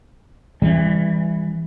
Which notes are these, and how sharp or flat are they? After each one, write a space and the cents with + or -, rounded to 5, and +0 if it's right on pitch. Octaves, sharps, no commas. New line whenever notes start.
E3 +0 G3 +30 C4 +30